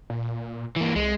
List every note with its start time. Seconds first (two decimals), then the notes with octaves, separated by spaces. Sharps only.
0.10 A#2
0.76 E3 A#3
0.96 C2 G#3